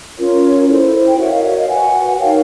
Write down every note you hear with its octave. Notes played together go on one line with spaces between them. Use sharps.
C#4 F4 A#4 C#5
E4 A4 C5
G5
F#4 A#4 C#5 E5 F#5
D#5 F5
D5 E5
D#5 F5
F#4 B4 F#5 G#5
G#5
D#4 F#4 A#4 C#5 F5 G5